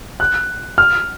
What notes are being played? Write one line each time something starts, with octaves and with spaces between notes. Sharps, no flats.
F#6
F6